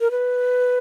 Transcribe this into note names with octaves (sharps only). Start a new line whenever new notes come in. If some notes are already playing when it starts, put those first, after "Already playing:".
A#4
B4